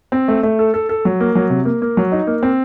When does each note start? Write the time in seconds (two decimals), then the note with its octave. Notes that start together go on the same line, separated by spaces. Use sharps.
0.12 C4
0.28 A3
0.43 A3
0.59 A4
0.74 A4
0.89 A4
1.05 F#3
1.20 A#3
1.35 F#3
1.50 C3
1.65 A#3
1.82 A#3
1.97 F#3
2.12 D#4
2.27 A#3
2.43 C4